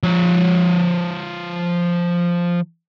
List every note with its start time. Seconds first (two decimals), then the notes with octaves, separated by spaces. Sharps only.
0.03 F3 C#5